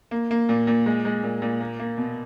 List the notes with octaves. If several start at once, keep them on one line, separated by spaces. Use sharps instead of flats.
A#3
A#3
A#2
A#2
G#3
G#3
A#2
A#2
A#3
A#3
B2